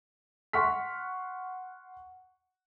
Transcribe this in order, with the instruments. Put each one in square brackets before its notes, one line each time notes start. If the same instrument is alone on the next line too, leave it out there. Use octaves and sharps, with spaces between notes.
[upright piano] F#5 C6 C#6 F6 B6